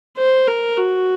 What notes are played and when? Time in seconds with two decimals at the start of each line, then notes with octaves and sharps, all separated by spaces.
0.17 C5
0.47 A#4
0.77 F#4